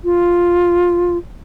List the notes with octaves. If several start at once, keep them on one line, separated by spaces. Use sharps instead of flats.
F4